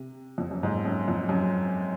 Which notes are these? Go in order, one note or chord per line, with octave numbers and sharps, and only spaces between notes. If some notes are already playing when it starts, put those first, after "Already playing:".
Already playing: C3
F2
F#2
G#2
F#2
F2
F#2